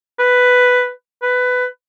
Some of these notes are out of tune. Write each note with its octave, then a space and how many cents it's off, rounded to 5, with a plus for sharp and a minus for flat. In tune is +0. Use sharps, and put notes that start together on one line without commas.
B4 +5
B4 +15